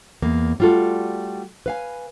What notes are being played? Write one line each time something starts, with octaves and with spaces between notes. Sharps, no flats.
E2 A#3
G3 A3 F4 F#4 A4
B4 F5 G#5